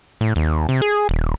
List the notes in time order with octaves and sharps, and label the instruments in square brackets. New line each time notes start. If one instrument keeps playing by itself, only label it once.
[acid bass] A2
D#2
C3
G#4
D#1